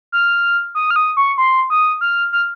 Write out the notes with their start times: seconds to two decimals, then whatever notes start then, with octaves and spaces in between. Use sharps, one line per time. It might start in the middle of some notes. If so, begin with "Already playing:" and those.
0.12 F6
0.75 D#6
0.91 F6
0.96 D#6
1.17 C#6
1.38 C6
1.70 D#6
2.01 F6
2.33 F6